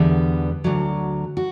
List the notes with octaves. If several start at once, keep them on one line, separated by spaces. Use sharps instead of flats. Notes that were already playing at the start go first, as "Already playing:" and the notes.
Already playing: E2 D3 G3 B3
D2 D3 F#3
F#4